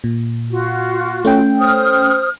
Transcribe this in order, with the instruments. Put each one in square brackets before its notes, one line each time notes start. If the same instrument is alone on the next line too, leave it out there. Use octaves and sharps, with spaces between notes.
[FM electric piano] A#2
[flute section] F4 F#4
[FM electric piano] A3 C#4 G5
[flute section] C5 D#6 F6